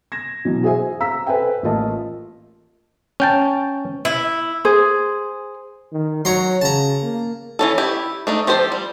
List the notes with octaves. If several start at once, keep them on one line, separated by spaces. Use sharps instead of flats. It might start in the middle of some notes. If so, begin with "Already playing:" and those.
G#6 A#6 E7
B2 E3 F#3
F#4 G#4 C5 E5 G#5
F5 A#5 E6 B6
A4 B4 C5 E5 G5 G#5
A1 A#3 F4 D#5 A5
C#4 G5 A5
E4
G#4 C5
D#3
F#3 C#5 A#5 C6
C#3 A5 A#5
A#3
E3 C#4 A4
E4 G4
A3 D4 D#4
F3 G4 A4 C5
G3